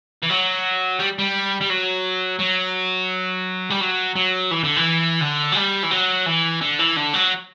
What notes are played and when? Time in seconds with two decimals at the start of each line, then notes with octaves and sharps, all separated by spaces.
0.23 E3
0.30 F#3
0.99 G3
1.18 G3
1.61 G3
1.70 F#3
2.40 F#3
3.70 G3
3.81 F#3
4.16 F#3
4.51 E3
4.64 D3
4.76 E3
5.21 D3
5.52 F#3
5.56 G3
5.83 E3
5.91 F#3
6.26 E3
6.61 D3
6.79 E3
6.97 D3
7.14 F#3